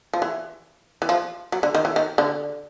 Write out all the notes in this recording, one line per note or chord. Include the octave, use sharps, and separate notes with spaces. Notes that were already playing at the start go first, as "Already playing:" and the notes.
F3
E3
E3
F3
F#3
D3
D#3
E3
D#3
D3